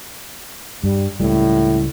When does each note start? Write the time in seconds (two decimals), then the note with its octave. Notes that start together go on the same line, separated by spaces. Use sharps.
0.84 G2 G3
1.20 C#2 A2 G3